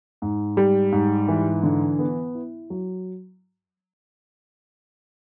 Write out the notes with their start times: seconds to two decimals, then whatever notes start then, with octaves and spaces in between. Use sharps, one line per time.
0.22 G#2
0.57 G3
0.92 G#2
1.28 E3
1.63 D3
1.99 B3
2.35 E4
2.70 F#3